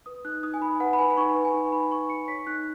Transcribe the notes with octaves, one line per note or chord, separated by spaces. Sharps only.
B4 D#6
D#4 F#6
D#4 D#6
G#5
D#4 B5
B4 F#5
B5
B4 G#5
B5
D#4 C#6
B4
G#5
D#4
D#4 B5
D#4 C#6
D#4 C#7
C#5 B6
D#4 F#6